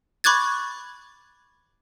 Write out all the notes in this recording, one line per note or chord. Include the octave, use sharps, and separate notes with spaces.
B5 C#6 D6 F#6 G#6 A6